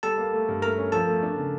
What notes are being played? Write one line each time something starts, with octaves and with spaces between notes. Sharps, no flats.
G3 A4 A5
A#3
A3
G2
A3 A#4 A#5
C#4
F3 A4 A5
A3
D4
C#3